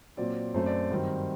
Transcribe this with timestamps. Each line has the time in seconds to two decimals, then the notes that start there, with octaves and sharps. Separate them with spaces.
0.17 A#2 F#3 C4 D5
0.54 F#2 F#3 A3 C4 C5
0.66 D5
0.91 G2 D#3 F#3 C4